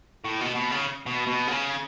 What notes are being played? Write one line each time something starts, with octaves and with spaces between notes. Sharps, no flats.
A2
B2
B2
C#3
B2
B2
C#3